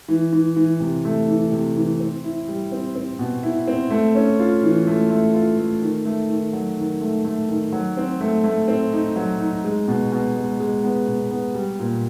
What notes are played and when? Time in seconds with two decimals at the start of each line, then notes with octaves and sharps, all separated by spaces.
0.08 E3
0.33 E3
0.57 E3
0.80 C3
1.05 A3
1.28 E3
1.52 C3
1.76 E3
2.00 C4
2.24 E4
2.48 G3
2.72 C4
2.95 C4
3.19 B2
3.43 E4
3.67 C4
3.90 A3
4.15 C#4
4.39 F4
4.63 E3
4.87 A3
5.10 A3
5.34 F4
5.58 A3
5.82 D#3
6.05 A3
6.29 D#3
6.53 F#3
6.78 D#3
7.01 A3
7.25 A3
7.49 D#3
7.72 F#3
7.97 C4
8.21 A3
8.44 A3
8.68 C4
8.93 D#4
9.16 F#3
9.40 D#4
9.64 G#3
9.88 B2
10.12 B2
10.36 G#3
10.60 G#3
10.84 B3
11.07 B2
11.31 B3
11.54 G3
11.79 A#2